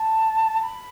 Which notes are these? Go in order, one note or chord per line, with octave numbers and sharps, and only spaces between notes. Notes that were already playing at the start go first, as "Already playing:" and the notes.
Already playing: A5
B5